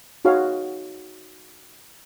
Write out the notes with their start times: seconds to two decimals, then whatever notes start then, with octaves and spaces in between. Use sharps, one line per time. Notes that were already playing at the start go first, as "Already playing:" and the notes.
0.25 D#4 F#4 G#4 C#5 F5